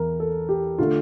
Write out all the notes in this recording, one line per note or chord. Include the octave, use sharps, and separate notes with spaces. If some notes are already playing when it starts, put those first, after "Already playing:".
Already playing: E2 E3 A#4
A4
G4
D3 A3 F4